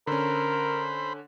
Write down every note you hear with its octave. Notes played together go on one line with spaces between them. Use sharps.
D3 C#4 A#4 C5 B5